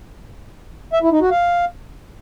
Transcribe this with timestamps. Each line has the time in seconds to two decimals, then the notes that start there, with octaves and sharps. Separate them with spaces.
0.93 E5
1.02 E4
1.12 D#4
1.21 F#4
1.31 F5